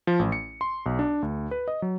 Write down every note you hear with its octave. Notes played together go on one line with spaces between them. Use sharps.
F3
A1
C#7
C6
B1
D4
D2
B4
D#5
F#3